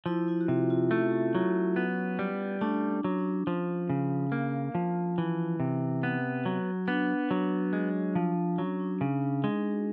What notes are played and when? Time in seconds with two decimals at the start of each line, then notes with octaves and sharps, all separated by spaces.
0.06 F3 E4
0.28 E4
0.41 F#4
0.48 C3 F4
0.70 F4
0.91 A3 C#4
1.35 F#3
1.76 B3
2.19 G3
2.61 A3 D4
2.90 C#4
3.04 F#3
3.18 D4
3.47 F3 C#4
3.90 C#3
4.32 A#3
4.75 F3
5.18 E3
5.60 C3
6.03 B3
6.46 F#3
6.87 B3 D4
7.31 F#3
7.73 G#3
8.16 F3
8.58 F#3 C#4
8.80 D4
9.01 C#3
9.22 D4
9.44 G#3 D#4
9.72 F#4